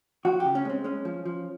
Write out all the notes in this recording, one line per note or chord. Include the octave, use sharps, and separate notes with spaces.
F3 F#4
G4
C#3
C#4
G#3 C4
G#3 C#4
F3
F3